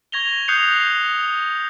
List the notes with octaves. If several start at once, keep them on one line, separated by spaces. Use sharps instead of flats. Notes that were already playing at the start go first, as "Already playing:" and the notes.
C#6 G#6 A#6 F7 G7
D#6 F#6 G6 C7 C#7 F7